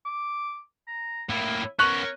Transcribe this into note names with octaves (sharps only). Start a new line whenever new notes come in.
D6
A#5
A2 A#3 E4
B3 C#4 A#4 C#6 F#6